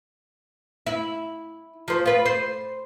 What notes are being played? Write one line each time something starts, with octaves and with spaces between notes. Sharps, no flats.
E4
F3 C5
F4 B4
C5